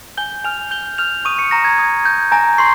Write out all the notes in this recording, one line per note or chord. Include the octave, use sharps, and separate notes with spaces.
G#5 G6 G7
G#5 F6 F7
G6 G7
F6 G6 F7
C#6 D#6 D#7
C#6 C#7
A#5 A#6
G#6
D#6 G#6
G6
G#5 A#5 A#6
C6 C#6 C7